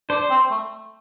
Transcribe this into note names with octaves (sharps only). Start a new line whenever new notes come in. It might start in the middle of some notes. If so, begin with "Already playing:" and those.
D4 C5
C4
A3